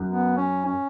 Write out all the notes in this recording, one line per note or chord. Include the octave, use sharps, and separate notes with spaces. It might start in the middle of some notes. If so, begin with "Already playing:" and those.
Already playing: F#2
B3
C#4
C#4